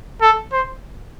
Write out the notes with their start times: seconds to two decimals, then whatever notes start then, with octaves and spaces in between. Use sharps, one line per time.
0.22 A4
0.52 C5